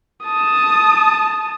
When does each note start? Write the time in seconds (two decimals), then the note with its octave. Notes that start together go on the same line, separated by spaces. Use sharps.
0.25 A5 D#6